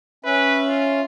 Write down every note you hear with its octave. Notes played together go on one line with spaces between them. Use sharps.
C#4 B4 E5
F4